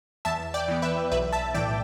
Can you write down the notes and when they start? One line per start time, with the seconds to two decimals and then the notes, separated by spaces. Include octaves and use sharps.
0.25 E2 E5 A5
0.54 D5 G5
0.68 E3 B3
0.82 B4 E5
1.12 B1 B4 E5
1.33 E5 A5
1.54 A2 E3 D5 G5